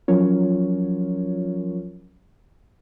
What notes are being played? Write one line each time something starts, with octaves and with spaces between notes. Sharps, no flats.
F3 F#3 C#4 F4 A#4 C#5